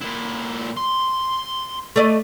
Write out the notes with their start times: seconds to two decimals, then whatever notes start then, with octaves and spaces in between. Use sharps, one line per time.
0.01 A#2 E4
0.77 C6
1.96 A3 D5 D#5